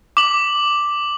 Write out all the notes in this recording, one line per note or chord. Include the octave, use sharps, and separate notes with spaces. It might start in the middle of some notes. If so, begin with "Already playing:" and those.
D6 F#7